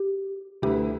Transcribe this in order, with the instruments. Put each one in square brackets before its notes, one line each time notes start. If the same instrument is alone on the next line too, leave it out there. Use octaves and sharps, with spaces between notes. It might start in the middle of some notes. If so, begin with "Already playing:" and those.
Already playing: [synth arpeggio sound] G4
[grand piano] D2 D3 A3 E4 B4 [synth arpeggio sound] G4